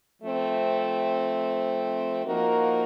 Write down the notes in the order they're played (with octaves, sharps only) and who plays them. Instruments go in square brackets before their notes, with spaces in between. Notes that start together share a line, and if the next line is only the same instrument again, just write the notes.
[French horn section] F3 A3 C4
F3 A#3 D#4 F#4 A#4